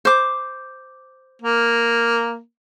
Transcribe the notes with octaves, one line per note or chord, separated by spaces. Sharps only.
C5 D6
A#3